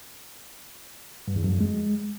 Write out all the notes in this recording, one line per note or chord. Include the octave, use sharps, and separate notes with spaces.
G2
E2
F#2
F2
G#3